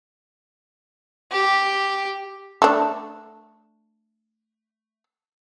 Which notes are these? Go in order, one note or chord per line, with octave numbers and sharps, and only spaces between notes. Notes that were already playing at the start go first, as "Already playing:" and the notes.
G4
A3 D4